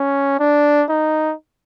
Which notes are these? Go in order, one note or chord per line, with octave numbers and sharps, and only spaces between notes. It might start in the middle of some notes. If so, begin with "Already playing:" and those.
Already playing: C#4
D4
D#4